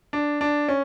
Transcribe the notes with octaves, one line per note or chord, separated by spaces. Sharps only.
D4
D4
C#4